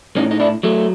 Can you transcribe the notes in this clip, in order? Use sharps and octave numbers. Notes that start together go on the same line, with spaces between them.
A2 C#4 D#4
D#4
D4 E4
F#3 A3